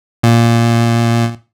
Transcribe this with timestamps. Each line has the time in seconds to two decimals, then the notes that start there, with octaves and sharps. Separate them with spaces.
0.23 A#2